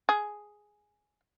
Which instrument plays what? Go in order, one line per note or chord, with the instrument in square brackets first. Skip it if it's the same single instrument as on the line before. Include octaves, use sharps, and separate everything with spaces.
[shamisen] G#4